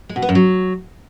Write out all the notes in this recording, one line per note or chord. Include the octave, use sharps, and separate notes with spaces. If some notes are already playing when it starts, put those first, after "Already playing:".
G#3
B2
B3
F#2
F#3